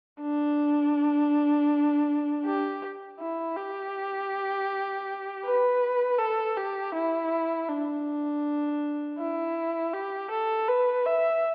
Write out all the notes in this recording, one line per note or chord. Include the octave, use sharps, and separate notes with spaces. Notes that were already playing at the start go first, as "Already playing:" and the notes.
D4
G4
E4
G4
B4
A4
G4
E4
D4
E4
G4
A4
B4
E5